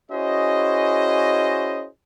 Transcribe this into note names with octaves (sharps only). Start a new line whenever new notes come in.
C#4 E4 F#4 G#4 C5 D#5